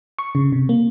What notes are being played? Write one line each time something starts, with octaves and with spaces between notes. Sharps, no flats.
C#6
C#3
C3
A#3